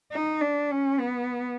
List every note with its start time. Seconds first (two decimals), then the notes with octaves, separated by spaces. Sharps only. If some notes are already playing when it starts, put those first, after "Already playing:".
0.12 D#4
0.41 D4
0.71 C#4
1.00 B3